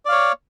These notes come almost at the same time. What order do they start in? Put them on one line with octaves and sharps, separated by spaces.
D5 F5 C#5